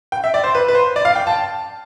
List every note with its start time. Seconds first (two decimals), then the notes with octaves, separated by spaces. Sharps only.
0.12 G5
0.24 E5
0.34 D5
0.44 C5
0.55 B4
0.68 B4
0.75 C5
0.96 D5
1.05 F5
1.15 G5
1.27 A5